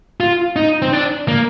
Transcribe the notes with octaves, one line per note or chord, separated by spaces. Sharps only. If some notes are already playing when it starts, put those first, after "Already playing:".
F4
D#4
C4
D4
A#3